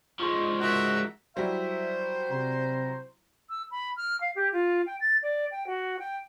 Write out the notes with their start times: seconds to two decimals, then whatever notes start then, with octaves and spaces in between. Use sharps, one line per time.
0.20 F3 G#3 C6 C#6
0.60 F#4 A#4 E5
1.37 F#3 G3 E4 C5 E5
2.31 C3 A#5
3.48 E6
3.70 B5
3.96 F6
4.20 F5
4.35 G4
4.52 F4
4.86 G5
5.00 A6
5.22 D5
5.51 G5
5.66 F#4
5.99 G5